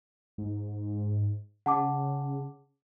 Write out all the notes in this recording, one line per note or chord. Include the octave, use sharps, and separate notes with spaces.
G#2
C#3 F#5 A5 D6